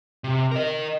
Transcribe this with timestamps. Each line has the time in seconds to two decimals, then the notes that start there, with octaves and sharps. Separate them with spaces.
0.24 C3
0.51 A#4 D#5